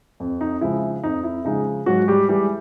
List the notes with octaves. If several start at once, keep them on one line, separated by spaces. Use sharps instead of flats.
F2
D#4
C#3 F3 G#3 E4
F2 D#4
E4
C#3 F3 G#3 D#4
G#2 F#3 F#4
G3 G4
E3 G3 G#3 G4